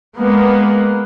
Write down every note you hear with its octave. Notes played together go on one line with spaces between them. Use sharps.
G#3 A#3 B3